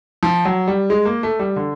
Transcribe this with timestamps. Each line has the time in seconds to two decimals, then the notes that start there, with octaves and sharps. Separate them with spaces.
0.23 F3
0.45 F#3
0.68 G3
0.90 G#3
1.05 A#3
1.23 A3
1.39 G3
1.56 D3